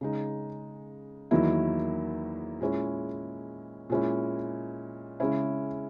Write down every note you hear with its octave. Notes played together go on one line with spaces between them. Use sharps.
C#3 G#3 D#4
E2 D#3 F#3 A#3 E4
A#2 G#3 C#4 E4
A#2 G#3 C#4 E4
C#3 G#3 C#4 E4